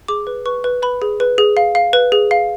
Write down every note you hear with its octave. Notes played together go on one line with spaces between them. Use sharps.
G#4 D6
B4
B4 C#6
B4
B4 B5
G#4
B4
G#4
F5
F5
B4
G#4
F5